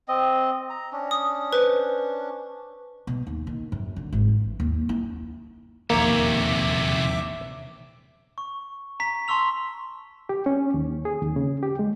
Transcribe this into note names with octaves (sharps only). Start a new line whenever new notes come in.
C4 D#5
A#5
C#4 D4
D#6
B4 C5
B2
D#2
D#3
F#2
D3
G#1
E3
D#2
E4
E1 A#1 D#2 C3 A#3 C#5 E5 D6
C#6
A#5 B6
A5 C6 C#6 E6 F7
G4
C#4
D#2
G#4
D#2
C#3
G4
G#3